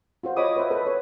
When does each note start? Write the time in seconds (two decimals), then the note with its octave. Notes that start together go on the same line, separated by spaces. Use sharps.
0.23 F4 F#4 C5
0.37 C#5 D#5 B5 D6 D#6
0.56 B4 C5 E5
0.71 A4 B4
0.86 C#5